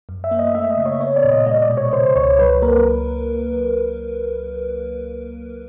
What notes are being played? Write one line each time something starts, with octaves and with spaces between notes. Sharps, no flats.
F#2
E5
A#3
D#5
A3 E5
D#5
C#3
C#5
B3 C#5
D5
A#2
D#5
G#3 D#5
D5
B2
C#5
C#3 C5
C#2 C#5
F#3 B4
A#3 A#4